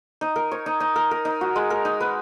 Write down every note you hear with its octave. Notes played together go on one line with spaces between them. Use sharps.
D#4
A#4
C#5
D#4
D#4
A#4
A#4
D#4
F#4
G#3
A#4
D#4
B4